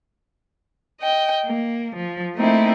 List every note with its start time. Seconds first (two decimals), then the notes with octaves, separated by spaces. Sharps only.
1.01 D#5 G5
1.46 A#3
1.96 F3
2.35 A3 A#3 C4 D#4 E4